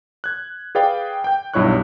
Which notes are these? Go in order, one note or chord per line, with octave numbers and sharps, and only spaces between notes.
F#6 G#6
G#4 B4 D5 F5 G5
G5 G6
B1 G2 E4 C#5 C#6 F#6